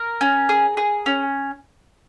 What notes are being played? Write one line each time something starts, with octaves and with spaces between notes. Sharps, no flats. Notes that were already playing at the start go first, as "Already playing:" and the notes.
Already playing: A#4
C#4
G#4
G#4
C#4